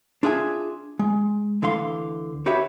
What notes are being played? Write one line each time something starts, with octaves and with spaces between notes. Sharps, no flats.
D4 F4 G#4 E5 G#5
G#3
D2 D3 E3 F5 C6
F#4 G4 B4 C#5 E5